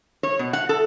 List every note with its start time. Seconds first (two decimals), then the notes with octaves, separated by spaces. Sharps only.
0.23 C#5
0.39 B2
0.53 F#5
0.69 A4